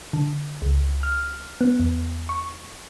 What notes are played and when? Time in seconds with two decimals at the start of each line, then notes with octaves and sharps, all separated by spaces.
0.13 D3
0.62 C#2
1.03 F6
1.61 B3
1.80 E2
2.29 C#6